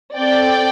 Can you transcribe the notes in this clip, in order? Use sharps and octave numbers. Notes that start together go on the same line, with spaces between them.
C4 A4 D5 G5